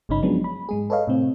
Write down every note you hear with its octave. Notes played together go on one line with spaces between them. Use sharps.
G#1 G2 C#3 C#4 D#4 B5
F3 F#3 G#3 B3 C#4 D4
B5
G#2 G#3 G#4
A4 B4 C#5 D#5 F5
A2 C3 C4